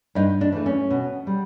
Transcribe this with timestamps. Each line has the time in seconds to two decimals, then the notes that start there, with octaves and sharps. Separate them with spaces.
0.15 G2 D#4
0.41 D4
0.52 E3 A3
0.66 C#4
0.90 B2
1.27 G3